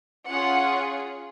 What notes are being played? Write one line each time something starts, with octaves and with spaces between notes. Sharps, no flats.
C#4 F4 G#4 F#5